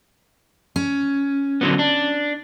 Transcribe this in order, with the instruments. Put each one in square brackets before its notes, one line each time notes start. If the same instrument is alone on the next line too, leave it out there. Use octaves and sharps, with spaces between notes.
[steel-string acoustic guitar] C#4
[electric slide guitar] D3 F#3 B3
D4